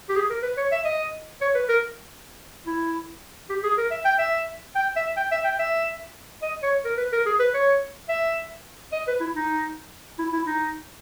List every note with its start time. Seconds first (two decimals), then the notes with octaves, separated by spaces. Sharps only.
0.09 G4
0.16 G#4
0.30 A#4
0.43 B4
0.57 C#5
0.72 E5
0.85 D#5
1.41 C#5
1.55 B4
1.69 A#4
2.67 E4
3.49 G4
3.64 G#4
3.77 A#4
3.91 E5
4.05 G5
4.19 E5
4.75 G5
4.96 E5
5.17 G5
5.31 E5
5.44 G5
5.59 E5
6.42 D#5
6.63 C#5
6.85 A#4
6.97 B4
7.12 A#4
7.26 G#4
7.39 B4
7.54 C#5
8.09 E5
8.92 D#5
9.07 B4
9.20 E4
9.35 D#4
10.19 E4
10.33 E4
10.47 D#4